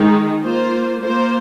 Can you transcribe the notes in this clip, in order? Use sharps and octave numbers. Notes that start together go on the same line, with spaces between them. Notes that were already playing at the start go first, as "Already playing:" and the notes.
Already playing: D#3 G#3 D#4
A#3 F4 C5
A#3 F4 C5